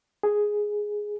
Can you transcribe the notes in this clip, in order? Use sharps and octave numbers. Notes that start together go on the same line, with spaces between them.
G#4